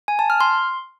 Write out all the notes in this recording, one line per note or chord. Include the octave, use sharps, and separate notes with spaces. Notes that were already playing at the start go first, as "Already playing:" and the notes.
G#5
A5
F6
C6